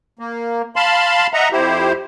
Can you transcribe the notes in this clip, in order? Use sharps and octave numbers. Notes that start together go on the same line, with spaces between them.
A#3
F5 A5 B5 C6
D#5 E5 F#5 A#5
F2 E4 G4 C5